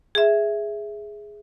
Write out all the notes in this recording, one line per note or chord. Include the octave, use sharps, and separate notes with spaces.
G#4 E5